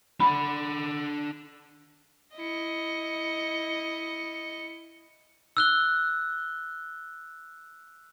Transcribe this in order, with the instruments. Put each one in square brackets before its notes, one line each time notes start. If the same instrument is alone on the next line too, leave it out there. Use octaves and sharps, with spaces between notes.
[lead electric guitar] D4 F#5 [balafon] B5
[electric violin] E4 C#7 [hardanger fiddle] D#5
[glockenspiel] E6 F#6 G7